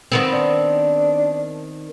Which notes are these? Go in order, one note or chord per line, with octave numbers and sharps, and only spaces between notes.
D#3 B3 C4
D4